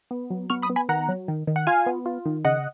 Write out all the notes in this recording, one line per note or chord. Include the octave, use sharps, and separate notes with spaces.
B3
F#3
B3 C#6 F6
B5 D#6
B3
G#5 B5
D#3 F#5 A#5
F#3
D#3
D#3
F#5
F4 F5 G#5
B3
F4
D#3
C#3 D#5 F#5